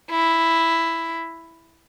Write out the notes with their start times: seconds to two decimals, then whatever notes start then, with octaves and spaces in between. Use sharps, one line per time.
0.11 E4